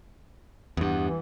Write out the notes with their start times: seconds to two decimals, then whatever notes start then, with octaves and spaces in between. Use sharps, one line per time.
0.77 E2 G2 B3
1.08 E3